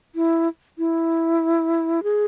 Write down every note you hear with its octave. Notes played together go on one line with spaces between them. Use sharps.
E4
E4
G#4